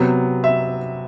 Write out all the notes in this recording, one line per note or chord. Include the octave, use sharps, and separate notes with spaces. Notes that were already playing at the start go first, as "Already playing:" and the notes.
Already playing: C3 F#3 B3
E5